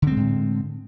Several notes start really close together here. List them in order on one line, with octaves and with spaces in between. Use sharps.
D3 C4 G#3 A2